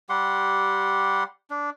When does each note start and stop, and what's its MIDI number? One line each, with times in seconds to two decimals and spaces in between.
0.09 1.24 55
0.09 1.24 67
0.09 1.24 78
0.09 1.24 84
1.50 1.70 62